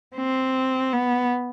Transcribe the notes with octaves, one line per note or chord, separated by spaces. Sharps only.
C4
B3